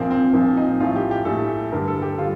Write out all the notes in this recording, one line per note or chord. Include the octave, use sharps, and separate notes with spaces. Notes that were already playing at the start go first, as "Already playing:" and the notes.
Already playing: A#1 A#2 F3 A#3 C4
C4
A#1 A#2 F3 A#3
D#4
A#1 A2 A3 F4
G4
G4
A#1 A2 A3 A4
G2 D3 G3 A#4
A4
G4
D3 G3 F4